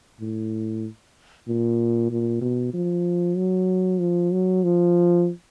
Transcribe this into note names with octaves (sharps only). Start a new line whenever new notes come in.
A2
A#2
A#2
B2
F3
F#3
F3
F#3
F3